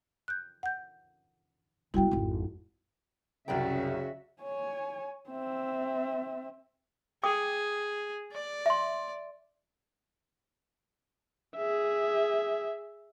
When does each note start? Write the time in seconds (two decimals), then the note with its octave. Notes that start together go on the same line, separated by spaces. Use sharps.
0.28 F#6 G6
0.63 F#5 G6
1.94 G3 B3 E4 F#4 G5
2.11 G#1 F2
3.48 C2 F#2 C#3 F#3 F#4 D5 E5 G5
4.42 C#5 G#5
5.29 C4 E5
7.24 G#4 G5 D6 D#6
8.31 D5
8.66 E5 C6
11.56 G#4 E5